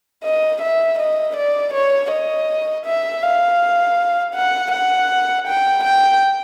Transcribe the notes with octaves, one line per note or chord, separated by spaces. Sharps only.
D#5
E5
D#5
D5
C#5
D#5
E5
F5
F#5
F#5
G5
G5